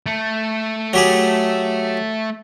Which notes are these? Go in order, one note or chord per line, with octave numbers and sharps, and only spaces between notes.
A3
F#3 G4 G#4